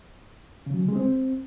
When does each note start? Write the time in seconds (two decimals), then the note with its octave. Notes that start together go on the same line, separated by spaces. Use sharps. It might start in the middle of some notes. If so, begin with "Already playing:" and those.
0.66 C#3
0.74 F#3
0.81 C#3
0.88 G#3
0.96 C4